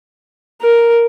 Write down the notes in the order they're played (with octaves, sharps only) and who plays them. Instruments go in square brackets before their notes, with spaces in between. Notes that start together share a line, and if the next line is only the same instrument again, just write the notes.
[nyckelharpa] A#4